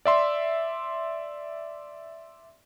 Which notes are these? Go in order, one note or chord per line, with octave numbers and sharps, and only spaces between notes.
D5 E5 C6